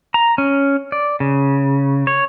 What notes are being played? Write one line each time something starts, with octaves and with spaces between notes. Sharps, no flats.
A#5
C#4
D5
C#3
C#5